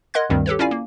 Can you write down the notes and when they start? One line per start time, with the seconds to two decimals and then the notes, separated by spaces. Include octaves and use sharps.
0.14 A#4 D#5 F#5 C6 F#6 G#6
0.30 D2 G2 D#3 G3 C4
0.46 G4 A4 B4 C#5
0.59 C#4 E4 F4 D5 F5 G#5
0.71 A#3